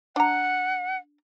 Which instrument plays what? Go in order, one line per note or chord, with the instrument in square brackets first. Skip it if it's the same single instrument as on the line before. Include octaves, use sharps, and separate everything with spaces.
[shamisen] D4 A#5 [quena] F#5